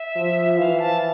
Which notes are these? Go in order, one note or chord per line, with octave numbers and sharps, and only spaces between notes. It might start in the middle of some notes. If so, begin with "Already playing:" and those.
Already playing: E5
F3
E3 F5
A5